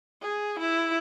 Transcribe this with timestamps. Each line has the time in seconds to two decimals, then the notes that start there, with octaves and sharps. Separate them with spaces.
0.22 G#4
0.59 E4